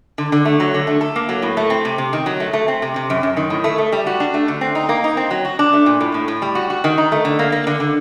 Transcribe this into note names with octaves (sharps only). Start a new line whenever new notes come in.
D3
D3
A3
F#3
D3
A3
A4
A#3
F#3
A2
A3
C4
C3
C3
D#3
F#3
A3
A3
C4
C3
C3
F#2
F#2
D#3
A2
A3
A3
G3
F#4
D4
A3
D3
C4
D#4
A#3
D#4
C4
F#3
F#4
D4
A3
A#2
A2
A2
A2
G3
F#4
F#4
D#3
D#4
A3
D3
A#3
A#3
D3
D3